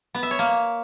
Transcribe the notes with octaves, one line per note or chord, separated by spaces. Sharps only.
B3
E5
C#5
A#3